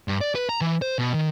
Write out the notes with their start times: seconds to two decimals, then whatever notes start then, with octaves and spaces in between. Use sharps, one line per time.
0.08 G2
0.21 D5
0.35 B4
0.49 A#5
0.61 E3
0.82 C5
0.99 B2
1.14 D#3